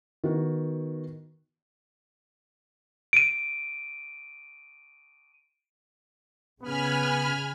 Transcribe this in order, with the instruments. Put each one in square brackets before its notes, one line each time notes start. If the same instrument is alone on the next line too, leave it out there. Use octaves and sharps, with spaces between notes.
[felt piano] D#3 B3 F#4
[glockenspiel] D7 D#7
[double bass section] C#3 [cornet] B3 [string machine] G#5 B5 F6